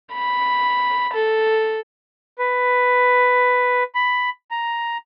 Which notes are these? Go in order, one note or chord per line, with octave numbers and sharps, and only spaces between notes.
B5
A4
B4
B5
A#5